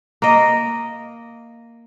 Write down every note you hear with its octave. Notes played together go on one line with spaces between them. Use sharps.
A#3 D#5